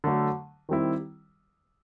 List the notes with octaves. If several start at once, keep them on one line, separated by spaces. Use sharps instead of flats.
D3 F#3 A3
D#3 G3 C4 E4